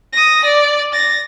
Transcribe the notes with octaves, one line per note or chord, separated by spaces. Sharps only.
D#6 A#6
D5
A6 A#6